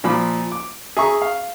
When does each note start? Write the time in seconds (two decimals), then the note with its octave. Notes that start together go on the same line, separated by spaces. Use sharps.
0.04 A#2 F3 B5 D6
0.52 D6
0.97 G#4 E5 A#5 C#6
1.22 F5